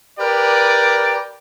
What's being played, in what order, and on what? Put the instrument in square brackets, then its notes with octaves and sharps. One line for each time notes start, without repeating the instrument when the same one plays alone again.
[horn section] G4 A#4 B4 D5